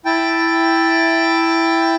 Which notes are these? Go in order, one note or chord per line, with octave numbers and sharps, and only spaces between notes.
E4 G5 A5